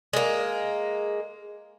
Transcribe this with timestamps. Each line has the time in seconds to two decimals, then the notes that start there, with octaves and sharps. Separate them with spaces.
0.13 G#3 A#3